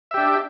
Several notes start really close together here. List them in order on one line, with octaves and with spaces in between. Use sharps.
E5 G4 D4